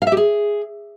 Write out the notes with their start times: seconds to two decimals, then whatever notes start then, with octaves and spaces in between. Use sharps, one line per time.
0.02 F5
0.07 E5
0.12 G4
0.17 G#4